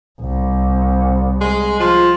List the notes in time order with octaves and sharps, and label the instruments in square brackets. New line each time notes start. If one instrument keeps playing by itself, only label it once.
[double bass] C2
[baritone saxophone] G#3
F3